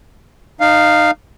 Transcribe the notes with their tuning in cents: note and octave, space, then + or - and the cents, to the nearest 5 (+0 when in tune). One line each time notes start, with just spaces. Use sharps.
D#4 -25 F5 +0